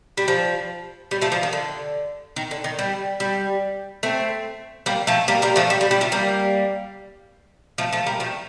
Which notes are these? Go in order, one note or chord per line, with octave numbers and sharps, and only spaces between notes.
G3
F3
G3
F3 A3
F3
D#3
D3
D#3
D3
D#3
G3
G3
A3 C4
G3 A#3
F3 A3
G3 A#3
G3 A#3
F3 A3
G3
G3
G3
F3 A3
G3 A#3
F3 A3
F3 A3
G3 A#3
F3 A3